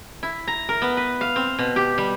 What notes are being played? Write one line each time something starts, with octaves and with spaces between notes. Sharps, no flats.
E4
A#5
A#4
B3
B4
F5
C4
B2
G4
G3